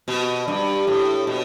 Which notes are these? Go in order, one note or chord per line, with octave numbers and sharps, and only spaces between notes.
B2
G2
A2
B2